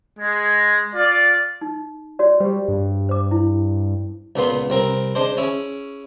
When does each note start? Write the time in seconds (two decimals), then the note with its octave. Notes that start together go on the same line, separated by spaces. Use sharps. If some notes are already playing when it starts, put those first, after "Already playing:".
0.18 G#3
0.93 F4 D5
1.61 D#4
2.19 F#4 C#5 D5
2.40 G3 G4 C5
2.68 G2
3.09 C5 D6
3.31 E4
4.36 C#2 A#2 B3 C6
4.70 C2 C4 A#4
5.15 G#3 D4 C5
5.37 C#4 E4 G#4